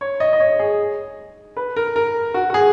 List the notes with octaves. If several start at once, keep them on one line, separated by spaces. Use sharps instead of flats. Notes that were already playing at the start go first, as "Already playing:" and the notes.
C#5
D#5
D#5
C#5
G#4
B4
A#4
A#4
F#4
F#4
G#4